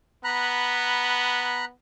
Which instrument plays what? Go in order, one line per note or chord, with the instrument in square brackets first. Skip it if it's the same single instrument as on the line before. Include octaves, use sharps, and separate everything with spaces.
[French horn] B3 [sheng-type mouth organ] A#5 B5 F#6